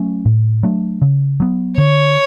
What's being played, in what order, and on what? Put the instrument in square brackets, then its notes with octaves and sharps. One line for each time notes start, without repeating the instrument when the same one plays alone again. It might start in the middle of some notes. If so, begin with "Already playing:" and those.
Already playing: [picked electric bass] F#3 A3 C#4
A2
F#3 A3 D4
C#3
F#3 B3
[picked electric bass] D3 [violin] C#5